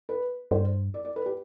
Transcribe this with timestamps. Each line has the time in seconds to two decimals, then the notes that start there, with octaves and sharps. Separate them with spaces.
0.09 B4
0.51 G2 C5
0.94 D5
1.05 D5
1.16 B4
1.26 G4